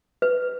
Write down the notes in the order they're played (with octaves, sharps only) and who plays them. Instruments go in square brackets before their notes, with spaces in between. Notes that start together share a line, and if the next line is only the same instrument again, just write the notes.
[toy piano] B4